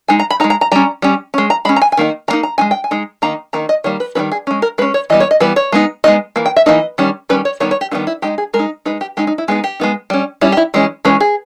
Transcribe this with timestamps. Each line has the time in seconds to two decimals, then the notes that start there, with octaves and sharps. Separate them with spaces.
0.08 G#3 D#4 G#5
0.19 A#5
0.31 B5
0.40 D#4 A#5
0.44 G#3
0.50 A#5
0.61 A#5
0.72 G3 C#4 A#5
1.02 G3 C#4
1.34 G#3 C#4
1.50 A#5
1.65 G#3 B5
1.69 C#4
1.76 A#5
1.82 G#5
1.92 G#5
1.97 D#3 A#3 D#4
2.28 D#3 A#3 D#4 A#5
2.43 A#5
2.58 G#3 D#4 G#5
2.71 G5
2.84 G#5
2.91 G#3 D#4
3.22 D#3 A#3 D#4 A#5
3.53 D#3 A#3 D#4 A#5
3.69 D#5
3.84 D#3 G3 A#3 C#5
4.00 B4
4.15 D#3 G3 A#3 D#4 B4
4.32 G#4
4.47 G#3 C#4
4.62 A#4
4.78 G#3 B4
4.82 C#4
4.94 C#5
5.10 E3 G3 B3 D#5
5.20 C#5
5.31 D#5
5.40 E3 G3 B3 B4
5.56 C#5
5.72 G#3 B3 D#4
6.04 G#3 B3 D#4 D#5
6.36 E3 A#3
6.46 G5
6.56 E5
6.66 E3 A#3 D#4 D#5
6.98 D#3 G3 C#4
7.29 D#3 G3 C#4 B4
7.45 C#5
7.60 D#3 G3 B3 D#4 C#5
7.71 C#5
7.81 G4
7.91 D#3 G3 B3 D#4 E4
8.07 E4
8.22 G#3 D#4 G4
8.38 G#4
8.54 G#3 A#4
8.59 D#4
8.86 G#3 D#4 B4
9.01 G4
9.17 G#3 D#4 G4
9.27 D#4
9.38 E4
9.48 G#3 B3 D#4 G#4
9.64 G4
9.80 G#3 B3 D#4
10.10 G3 C#4
10.41 G3 C#4 E4
10.52 G4
10.57 E4
10.74 E3 G#3 C#4
11.05 E3 G#3 C#4 B4
11.20 G#4